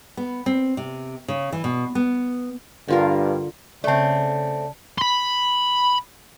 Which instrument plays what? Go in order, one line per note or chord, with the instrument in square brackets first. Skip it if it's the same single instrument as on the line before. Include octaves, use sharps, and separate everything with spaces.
[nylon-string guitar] B3
C4
C3
C#3
E3
B2
B3
[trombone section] G2 [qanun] D3 F4 A#4
[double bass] C#3 [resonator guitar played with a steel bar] A3 C4 [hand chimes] D5 A5
[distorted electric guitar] B5 C6